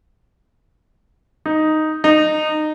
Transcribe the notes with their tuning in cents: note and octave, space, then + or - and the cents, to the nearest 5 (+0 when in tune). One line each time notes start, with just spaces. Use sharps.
D#4 +0
D#4 -20